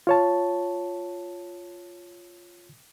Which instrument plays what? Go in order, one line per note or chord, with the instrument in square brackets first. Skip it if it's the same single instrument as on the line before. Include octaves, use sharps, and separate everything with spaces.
[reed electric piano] F4 C#5 A5